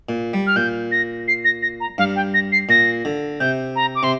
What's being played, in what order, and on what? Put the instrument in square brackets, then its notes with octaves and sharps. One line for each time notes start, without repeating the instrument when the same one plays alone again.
[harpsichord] A#2
G3
[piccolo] F6
[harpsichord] A#2 [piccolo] G6
[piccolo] A#6
C7
A#6
A#6
A#5
[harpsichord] G2 [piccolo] F5
[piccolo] G5
A#6
C7
[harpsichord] A#2 [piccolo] A#6
[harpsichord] D3
[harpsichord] C3 [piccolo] G6
[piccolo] A#5
D6
[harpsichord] C3 [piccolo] C6